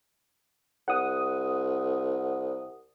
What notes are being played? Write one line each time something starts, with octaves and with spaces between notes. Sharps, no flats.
C2 F#5 D#6